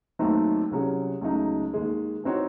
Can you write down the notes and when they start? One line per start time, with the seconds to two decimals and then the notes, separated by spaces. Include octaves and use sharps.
0.19 D#2 D#3 F#3 A3 C4
0.71 C2 C3 F#3 C#4 G#4
1.22 C#2 C#3 F#3 A3 D#4
1.74 D#2 D#3 G#3
2.23 E3 C4 D#4 F#4 C#5